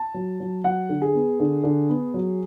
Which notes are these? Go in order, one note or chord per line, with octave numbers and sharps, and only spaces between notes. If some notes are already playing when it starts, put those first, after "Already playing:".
Already playing: A5
F#3
F#3
F#3 F#5
D3
G#4
B3
D3
D3
B3
F#3